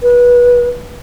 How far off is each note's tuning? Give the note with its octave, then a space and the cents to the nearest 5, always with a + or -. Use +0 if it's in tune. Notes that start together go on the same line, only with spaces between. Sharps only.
B4 -25